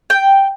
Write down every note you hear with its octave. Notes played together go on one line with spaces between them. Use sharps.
G5